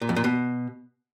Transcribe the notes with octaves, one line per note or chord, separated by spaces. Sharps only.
A#2
F2
A#2
B2